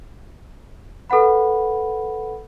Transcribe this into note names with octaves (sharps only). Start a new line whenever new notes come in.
A4 B4 F#5 B5